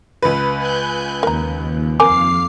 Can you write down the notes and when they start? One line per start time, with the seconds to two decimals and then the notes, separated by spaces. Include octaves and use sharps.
0.22 C#2 B4
0.57 G#5 F#6 G6
1.23 D#2 A#4 A#5
2.00 F2 C4 A#4 F5 G#5 D6 C7